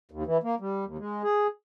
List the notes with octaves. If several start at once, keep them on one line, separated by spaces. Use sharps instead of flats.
D#2
E3
A#3
G3
D#2
G#3
G#4